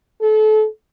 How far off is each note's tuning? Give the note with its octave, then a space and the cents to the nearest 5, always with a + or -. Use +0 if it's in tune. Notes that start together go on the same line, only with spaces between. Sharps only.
A4 -30